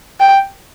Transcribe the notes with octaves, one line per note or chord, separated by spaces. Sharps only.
G5